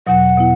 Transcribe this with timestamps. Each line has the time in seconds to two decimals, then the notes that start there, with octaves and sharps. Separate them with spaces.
0.07 E2 B2 F#3 F#5
0.37 B2 B3 E4